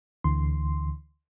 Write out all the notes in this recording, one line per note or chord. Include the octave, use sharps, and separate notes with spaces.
D2 D3 E3 C6